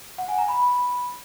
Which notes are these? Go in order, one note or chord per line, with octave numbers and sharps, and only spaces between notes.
F#5
G#5
A#5
B5